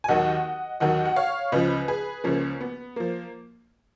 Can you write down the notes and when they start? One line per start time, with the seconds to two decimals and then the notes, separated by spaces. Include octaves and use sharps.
0.04 G#5
0.08 D#2 D#3 F#3 D#5 F#5
0.80 D#2 D#3 F#3 D#5 F#5
1.05 F#5
1.16 C#5 F5
1.52 C#2 C#3 F3 B4 D#5
1.88 G#4 B4
2.24 C#2 C#3 F3 A#3 C#4
2.61 B3
2.96 F3 A#3